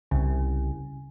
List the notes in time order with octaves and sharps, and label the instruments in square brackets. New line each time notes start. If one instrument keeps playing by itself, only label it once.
[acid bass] C2 [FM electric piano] C#3